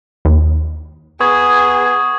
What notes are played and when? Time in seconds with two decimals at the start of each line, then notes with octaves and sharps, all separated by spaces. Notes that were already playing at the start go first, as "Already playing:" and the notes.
0.25 D#2
1.21 B3 G#4 C#6 D#6 G#6